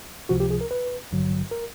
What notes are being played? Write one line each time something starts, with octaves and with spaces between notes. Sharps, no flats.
C#2 C3 F3 F#4
G4
G#4
A#4
B4
A1 G2 D3 F#3
A#4